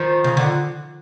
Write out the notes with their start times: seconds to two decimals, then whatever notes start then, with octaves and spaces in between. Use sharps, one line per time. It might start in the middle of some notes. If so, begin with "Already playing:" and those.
Already playing: D#3 F3
0.24 C#3
0.37 D3